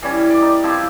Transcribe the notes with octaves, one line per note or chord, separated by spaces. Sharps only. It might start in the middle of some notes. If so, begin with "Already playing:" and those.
E3 G3 C#4
D5
D#4 D5
F3 C4 E4 G4